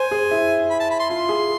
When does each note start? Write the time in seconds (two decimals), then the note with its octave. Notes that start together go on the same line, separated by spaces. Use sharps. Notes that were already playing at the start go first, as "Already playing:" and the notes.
Already playing: C5 G#5
0.11 G#4
0.31 E4
0.70 B5
0.80 A5
0.90 B5
0.99 C6
1.10 F4 C6
1.29 G#4